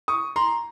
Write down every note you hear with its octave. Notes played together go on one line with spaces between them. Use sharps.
C#6 D#6
A#5 C6